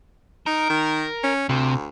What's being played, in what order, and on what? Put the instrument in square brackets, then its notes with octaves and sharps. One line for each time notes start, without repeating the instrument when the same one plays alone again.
[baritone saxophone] D#4 [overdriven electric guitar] A#4
[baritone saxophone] D#3
C#4
[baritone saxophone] D2 [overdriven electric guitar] C3